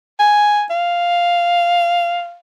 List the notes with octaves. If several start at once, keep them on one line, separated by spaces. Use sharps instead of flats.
G#5
F5